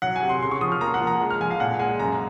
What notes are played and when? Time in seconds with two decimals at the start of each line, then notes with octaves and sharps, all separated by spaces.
0.02 F#3 F#5
0.16 G#5
0.23 C3
0.29 C6
0.42 C#3 C6
0.51 C#6
0.61 F3 D#6
0.72 F6
0.81 A#3 A#5
0.94 F#5
1.01 F3
1.07 A#5
1.21 G#3
1.30 F6
1.41 F3 G#5
1.50 F5
1.60 A#2 F#5
1.79 G#3 G#5
1.99 F#2 A#5